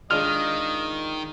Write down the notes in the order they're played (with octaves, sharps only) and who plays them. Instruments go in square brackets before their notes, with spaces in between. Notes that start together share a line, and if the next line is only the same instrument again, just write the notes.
[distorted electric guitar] D#3 [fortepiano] G#3 D4 F4 [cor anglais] D#5 [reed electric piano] F6